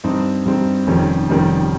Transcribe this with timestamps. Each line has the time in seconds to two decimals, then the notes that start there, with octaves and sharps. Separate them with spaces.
0.04 G2 G3 C4 D#4
0.45 G2 G3 C4 D#4
0.87 F1 F2 D#3 G3 C#4
1.29 F1 F2 D#3 G3 C#4